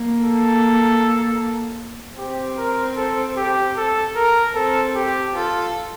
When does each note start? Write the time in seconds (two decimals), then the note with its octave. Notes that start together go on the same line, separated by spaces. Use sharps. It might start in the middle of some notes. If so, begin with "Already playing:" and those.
Already playing: A#3
0.20 A4
2.18 C4 G4
2.58 A#4
2.97 A4
3.37 G4
3.77 A4
4.16 A#4
4.55 C4 A4
4.95 G4
5.34 F4 A4